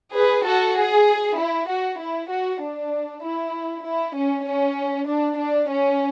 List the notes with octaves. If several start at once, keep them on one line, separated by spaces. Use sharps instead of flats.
G#4 B4
F#4 A4
G#4
E4
F#4
E4
F#4
D4
E4
E4
C#4
C#4
D4
D4
C#4